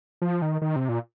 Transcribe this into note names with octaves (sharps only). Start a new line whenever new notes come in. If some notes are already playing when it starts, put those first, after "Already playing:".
F3
D#3
D#3
C3
A#2